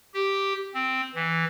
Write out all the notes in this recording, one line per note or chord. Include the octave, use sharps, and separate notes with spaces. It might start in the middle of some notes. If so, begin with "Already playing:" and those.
G4
C4
E3